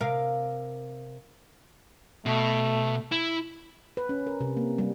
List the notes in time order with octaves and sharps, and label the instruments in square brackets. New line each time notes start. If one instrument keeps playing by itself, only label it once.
[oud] C3 A#4 F5
[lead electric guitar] B2 [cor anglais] A3
[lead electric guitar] E4
[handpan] B4
C#4
A#4
C3
A#3
G3